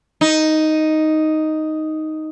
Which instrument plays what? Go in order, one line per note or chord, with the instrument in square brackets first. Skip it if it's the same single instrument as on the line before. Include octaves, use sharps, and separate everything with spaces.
[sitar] D#4